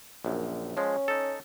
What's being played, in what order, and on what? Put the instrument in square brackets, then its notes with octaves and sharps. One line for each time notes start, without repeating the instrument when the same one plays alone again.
[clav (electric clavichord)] A#1 F#2
[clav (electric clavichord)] F3 G#3 [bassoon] C#4
[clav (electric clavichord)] D#4 A4